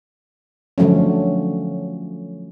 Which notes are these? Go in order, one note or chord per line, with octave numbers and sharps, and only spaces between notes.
D3 F3 F#3 A3 C#4